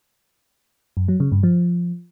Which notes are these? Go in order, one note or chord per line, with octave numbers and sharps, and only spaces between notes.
F#2
F#3
C#3
G2
F3